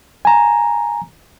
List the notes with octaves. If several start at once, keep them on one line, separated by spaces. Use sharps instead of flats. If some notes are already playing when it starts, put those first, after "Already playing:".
G#5 A#5